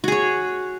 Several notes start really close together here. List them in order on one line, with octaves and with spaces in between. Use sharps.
F#4 G#4 C#5